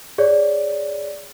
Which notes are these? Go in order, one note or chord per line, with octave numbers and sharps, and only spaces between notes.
G#4 C#5 D5